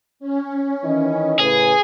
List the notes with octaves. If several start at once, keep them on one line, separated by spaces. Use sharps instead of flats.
C#4
D#3 E3 D#5
A2 C#3 G#4 B4